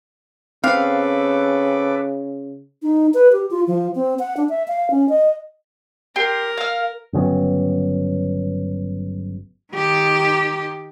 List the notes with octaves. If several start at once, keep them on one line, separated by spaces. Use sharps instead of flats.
C#3 C4 A4 B4 F5 D6
D#4
B4
G4
F4
F3
C4
F#5
D4
E5
F5
C#4
D#5
G4 A#4 C6
F5 F6
G1 C#3 F#3 B3
D#3 G4